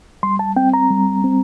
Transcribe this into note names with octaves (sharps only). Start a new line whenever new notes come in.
G3 C6
A5
C4 G5
A#5
G3
C4